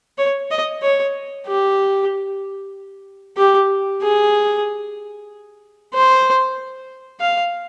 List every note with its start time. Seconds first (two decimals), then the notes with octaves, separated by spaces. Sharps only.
0.18 C#5
0.51 D#5
0.82 C#5
1.47 G4
3.37 G4
4.02 G#4
5.94 C5
7.20 F5